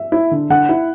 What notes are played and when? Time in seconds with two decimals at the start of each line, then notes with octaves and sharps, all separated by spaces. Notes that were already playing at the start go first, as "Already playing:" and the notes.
Already playing: E5
0.12 E4
0.31 D3
0.50 D3 F#5
0.69 E4